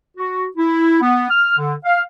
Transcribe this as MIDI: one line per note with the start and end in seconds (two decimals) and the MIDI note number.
0.17 0.44 66
0.57 0.98 64
1.01 1.26 59
1.30 1.56 89
1.58 1.74 50
1.84 2.00 77